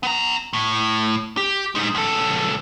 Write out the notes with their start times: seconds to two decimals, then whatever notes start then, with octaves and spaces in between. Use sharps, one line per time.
0.03 B3 A#5
0.53 A2
1.37 G4
1.75 G#3 D#4
1.95 C#2 A4